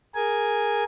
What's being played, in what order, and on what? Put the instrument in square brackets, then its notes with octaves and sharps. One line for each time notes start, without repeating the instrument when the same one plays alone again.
[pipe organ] G#4 A#4 G#5